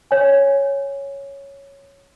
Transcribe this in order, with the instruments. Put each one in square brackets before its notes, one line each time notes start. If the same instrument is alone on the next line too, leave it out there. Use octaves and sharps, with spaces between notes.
[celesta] C#5 G#5